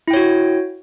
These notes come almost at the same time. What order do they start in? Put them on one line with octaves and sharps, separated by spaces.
E4 G5 C#5 F#4